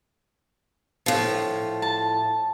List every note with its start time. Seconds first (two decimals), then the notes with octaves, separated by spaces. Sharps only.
1.06 A2 F3
1.82 A5